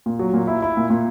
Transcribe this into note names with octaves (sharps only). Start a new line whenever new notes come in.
A#2
F#3
A#2
E4
E4
A#2
A#2